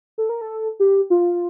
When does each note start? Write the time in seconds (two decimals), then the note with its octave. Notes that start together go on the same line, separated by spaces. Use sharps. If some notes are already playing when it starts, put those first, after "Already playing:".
0.18 A4
0.29 A#4
0.41 A4
0.80 G4
1.10 F4